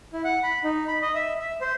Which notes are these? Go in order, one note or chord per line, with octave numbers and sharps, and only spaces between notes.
E4
F#5
B5
D#4
B5
D#5
E5
E5
C5